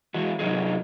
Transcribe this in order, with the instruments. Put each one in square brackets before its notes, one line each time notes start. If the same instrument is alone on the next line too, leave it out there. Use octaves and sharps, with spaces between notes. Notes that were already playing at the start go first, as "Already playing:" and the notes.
[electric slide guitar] E3 G#3 F#4
C3 F#3 D#4 F4 G#4